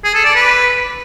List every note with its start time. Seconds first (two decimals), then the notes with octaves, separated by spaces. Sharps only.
0.04 G#4
0.15 A4
0.25 D5
0.35 B4